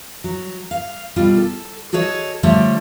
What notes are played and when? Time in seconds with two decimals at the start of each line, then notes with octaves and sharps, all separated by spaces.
0.24 F#3
0.71 F5
1.16 B2 G3 F4
1.37 A4
1.93 F#4 G#4 A4 C#5 D#5
2.43 D3 F3 G3 A3 C#5